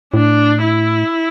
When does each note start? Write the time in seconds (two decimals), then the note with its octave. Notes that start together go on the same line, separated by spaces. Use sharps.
0.14 A2 D4
0.63 E4